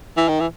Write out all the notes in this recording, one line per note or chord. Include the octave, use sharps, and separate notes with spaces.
E3
D#3
E3